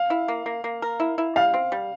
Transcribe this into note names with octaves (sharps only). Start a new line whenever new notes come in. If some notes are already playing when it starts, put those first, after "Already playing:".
Already playing: F5
E4
A#3
A#3
A#3
A#4
E4
E4
G3 F5
C4
G3